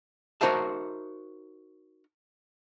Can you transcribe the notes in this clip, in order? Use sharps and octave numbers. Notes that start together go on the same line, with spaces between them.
D#4 F#4 A#4 C5 E5 A5